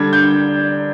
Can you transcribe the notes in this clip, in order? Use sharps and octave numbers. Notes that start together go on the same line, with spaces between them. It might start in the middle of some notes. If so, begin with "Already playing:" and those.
Already playing: D3 G3 D4 G#6
G6